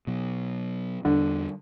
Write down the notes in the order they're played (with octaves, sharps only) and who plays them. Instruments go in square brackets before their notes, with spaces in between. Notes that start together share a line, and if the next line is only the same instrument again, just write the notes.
[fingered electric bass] B2 F#3
[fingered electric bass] E2 G3 [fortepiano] D3